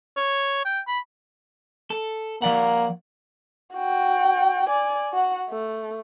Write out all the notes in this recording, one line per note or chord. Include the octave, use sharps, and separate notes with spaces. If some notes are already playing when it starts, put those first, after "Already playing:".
C#5
G5
B5
A4
F3 A#3 D5 F#5
F#4 G5
D5 G#5
F#4 F#5
A3